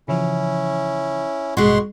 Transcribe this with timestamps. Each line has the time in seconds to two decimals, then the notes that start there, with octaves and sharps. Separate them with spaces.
0.08 C#3 E3 F3 C#4 E4
1.57 A1 G2 B2 G#3 F#5 C6 C#6